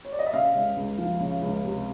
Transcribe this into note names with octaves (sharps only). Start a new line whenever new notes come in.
C#5
D5
D#5
E5
C#3 F5
C#2
C#2
F3
C#3
C#2
C3